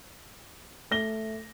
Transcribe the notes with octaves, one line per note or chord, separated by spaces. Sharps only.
A3 A#6 G7